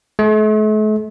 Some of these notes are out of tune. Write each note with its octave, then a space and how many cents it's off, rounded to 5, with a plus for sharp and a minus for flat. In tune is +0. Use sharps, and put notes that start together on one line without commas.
A3 -45